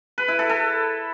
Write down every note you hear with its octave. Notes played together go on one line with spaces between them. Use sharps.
B4
E4
A4
A4